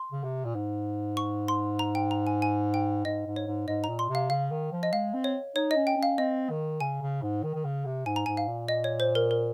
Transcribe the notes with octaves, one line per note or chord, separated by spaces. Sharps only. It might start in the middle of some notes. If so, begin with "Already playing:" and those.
Already playing: C6
C#3
C3
A#2
G#2
C#6
C6
A#5
G5
A#5
G#5
G#5
G5
G#2 D#5
G#2
C#5
G#2
G#2 D#5
A#2 A#5
C6
C3
F5
C#3 F5
D#3
F3
D#5
G#3 F5
C4
C#5
D#4 C#5
C#4 D#5
G5
C#4
F5
C4 D#5
D#3
C#3 G#5
C#3
G#2
D#3
D#3
C#3
C3
G#2 G#5
A#5
G#2 G#5
F5
A#2
D#5
C#5
C5
A#4
A#4